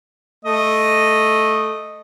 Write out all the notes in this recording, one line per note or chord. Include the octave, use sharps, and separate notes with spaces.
A3 D#5